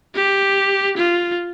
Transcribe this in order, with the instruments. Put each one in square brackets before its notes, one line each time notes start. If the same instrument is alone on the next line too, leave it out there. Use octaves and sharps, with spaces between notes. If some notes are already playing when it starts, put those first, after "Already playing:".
[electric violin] G4
F4